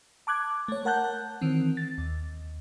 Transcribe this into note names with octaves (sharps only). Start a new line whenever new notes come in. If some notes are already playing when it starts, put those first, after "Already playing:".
A5 D6 F#6 G#6
A3 C#5
A#4 F#5 A5 F#6 G6
D#3 E3 C4
A6
D#2